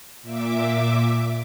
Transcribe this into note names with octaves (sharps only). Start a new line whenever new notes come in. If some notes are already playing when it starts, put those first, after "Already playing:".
A#2 E5 D6